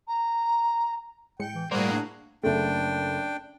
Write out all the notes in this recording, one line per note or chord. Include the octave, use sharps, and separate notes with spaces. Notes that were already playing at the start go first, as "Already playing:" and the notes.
A#5
A2 G#3 G5 C#7
E3
A2 G3 A#3 F#4 G#4 A#4 C5 D5
D4
F#1 A3 D4 G5